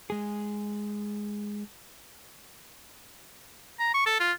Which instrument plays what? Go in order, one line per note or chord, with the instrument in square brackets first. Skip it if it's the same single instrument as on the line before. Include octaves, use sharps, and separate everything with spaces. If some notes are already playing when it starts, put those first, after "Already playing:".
[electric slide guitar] G#3 G#4
[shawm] A#5
C#6
A4
F4